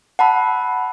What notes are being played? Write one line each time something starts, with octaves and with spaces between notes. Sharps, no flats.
F#5 A5 B5 E6